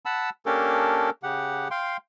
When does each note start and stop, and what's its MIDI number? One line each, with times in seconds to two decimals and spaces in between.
0.05 0.30 78
0.05 0.30 81
0.05 0.30 83
0.05 0.30 88
0.46 1.10 58
0.46 1.10 61
0.46 1.10 62
0.46 1.10 67
0.46 1.10 69
0.46 1.10 70
1.23 1.68 49
1.23 1.68 67
1.23 1.68 78
1.71 1.97 77
1.71 1.97 79
1.71 1.97 84